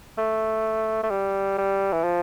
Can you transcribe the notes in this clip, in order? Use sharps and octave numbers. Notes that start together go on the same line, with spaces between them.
A3
A3
G3
G3
E3
F3